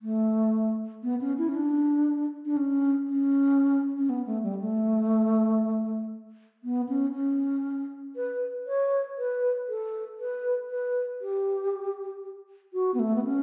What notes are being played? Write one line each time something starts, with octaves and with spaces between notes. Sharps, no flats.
A3
B3
C#4
E4
C#4
D4
D4
C#4
C#4
C#4
B3
A3
G3
A3
B3
C#4
C#4
B4
C#5
B4
A4
B4
B4
G4
F#4
B3
A3
B3
C#4